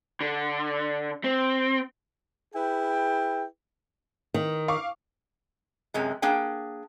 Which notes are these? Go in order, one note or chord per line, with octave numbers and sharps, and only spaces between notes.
D3
C4
E4 G#4 B4 G5
D#3
F5 C#6 D6
F#2 C3 G#3
A#3 D4 G#4 G5